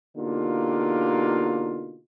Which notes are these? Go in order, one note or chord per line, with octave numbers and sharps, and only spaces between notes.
B2 D3 A#3 D#4 F4 G4